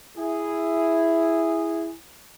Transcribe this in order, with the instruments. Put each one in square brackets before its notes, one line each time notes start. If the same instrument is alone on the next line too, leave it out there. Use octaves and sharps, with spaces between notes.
[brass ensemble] E4 G#4